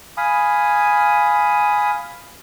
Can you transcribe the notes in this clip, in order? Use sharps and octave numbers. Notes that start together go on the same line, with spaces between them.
F5 G#5 B5 D#6